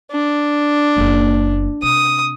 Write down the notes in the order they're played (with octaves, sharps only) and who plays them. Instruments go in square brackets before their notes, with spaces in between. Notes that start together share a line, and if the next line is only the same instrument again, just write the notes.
[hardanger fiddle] D4
[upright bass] F#1 A#3
[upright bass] C3 [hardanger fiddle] D#6